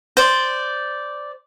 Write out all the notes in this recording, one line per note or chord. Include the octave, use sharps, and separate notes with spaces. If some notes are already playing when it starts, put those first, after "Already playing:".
C5 D5